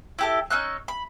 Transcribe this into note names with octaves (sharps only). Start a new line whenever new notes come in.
E4 G4 A4
C#4 D#4 E6 F#6
B5